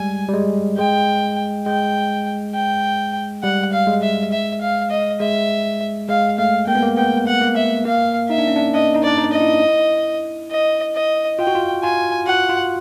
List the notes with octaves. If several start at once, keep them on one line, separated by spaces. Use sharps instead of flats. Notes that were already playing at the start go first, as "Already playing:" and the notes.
Already playing: G3 G#3 G#5
G3
G#3
G#3 G5
G#3 G5
G5
G3 F#5
F5
G#3
E5
E5
F5
D#5
G#3 E5
G#3 F5
A3 F5
A#3 G5
B3
A#3
B3 G5
F#5
A#3
E5
A#3 F5
D#4 E5
D4
C#4
D4
D4 D#5
D#4
D4 D5
D#4
D#5
E4
D#5
D#5
F4 G5
F#4
F4
F4 G#5
F#4 F#5
F4